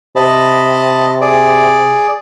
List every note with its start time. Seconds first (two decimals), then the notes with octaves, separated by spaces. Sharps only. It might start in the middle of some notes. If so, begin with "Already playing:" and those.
0.16 C3 D#5 A5 B5
1.21 G#4 D5